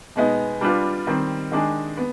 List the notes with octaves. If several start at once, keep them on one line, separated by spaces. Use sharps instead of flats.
B2 G#3 B3 D#4
G3 D4 F4 B4
D#3 G3 C4
D#3 G#3 D4 G#4
B3